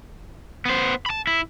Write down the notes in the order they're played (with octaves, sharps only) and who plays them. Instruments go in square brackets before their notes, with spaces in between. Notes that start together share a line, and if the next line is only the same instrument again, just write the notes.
[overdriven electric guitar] B3 C5
A5 B5
E4